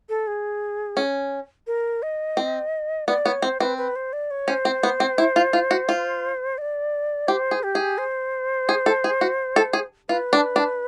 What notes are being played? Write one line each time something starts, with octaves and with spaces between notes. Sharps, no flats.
A4
G#4
C#4
A#4
D#5
C4
B3 D5
B3 C#5
C4 C5
C4 B4
B4
C5
D5
C#5
C#4 C5
C4
B3
C4
E4
F4
F4
F#4
F4
D#5
D5
G4 C5
G#4
G4
G#4
C5
G#4
A4
G#4
F#4
A4
G#4
F4 B4
D4
D4